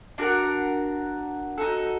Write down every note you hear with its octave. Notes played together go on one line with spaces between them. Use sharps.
D4 F#4 A#4 F#5
D#4 F#4 A4